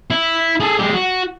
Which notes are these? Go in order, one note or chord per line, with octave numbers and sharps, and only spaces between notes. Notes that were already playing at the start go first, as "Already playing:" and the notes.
E4
G#4 A4
G#3 G4
F#4